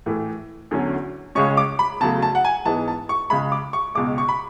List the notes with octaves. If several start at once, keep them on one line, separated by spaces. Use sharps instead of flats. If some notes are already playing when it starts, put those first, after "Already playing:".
A2 E3 A3
E2 D3 F#3 C#4
C#2 C#3 G#3 C#4 C#6
D6
B5
E2 C#3 F#3 A3 A5
A5
F#5
G#5
G#2 E3 G#3 B3 A5
A5
C#6
C#2 C#3 G#3 B5
D6
C#6
C#2 B2 G#3 D6
C#6
B5